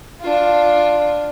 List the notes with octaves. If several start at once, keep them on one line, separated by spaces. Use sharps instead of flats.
D4 F4